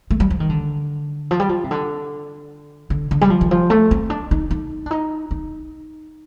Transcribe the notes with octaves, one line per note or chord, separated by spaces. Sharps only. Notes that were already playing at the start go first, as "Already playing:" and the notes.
A3
G3
F3
D#3
D3
F3
G3
F3
C3
D3
D3
D3
G3
F3
D#3
F3
A3
C4
D4
D#4
D#4
D4
D#4
D#4